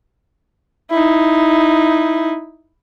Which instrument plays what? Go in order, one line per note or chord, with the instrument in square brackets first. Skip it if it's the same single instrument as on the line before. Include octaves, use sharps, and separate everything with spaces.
[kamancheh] D#4 E4